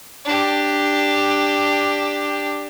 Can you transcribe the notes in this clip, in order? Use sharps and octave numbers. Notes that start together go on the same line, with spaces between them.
D4 G4